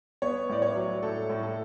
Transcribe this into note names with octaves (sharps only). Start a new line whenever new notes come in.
B3 C#5
A2 D5
C#5
F#3
A2 A4
A2
A4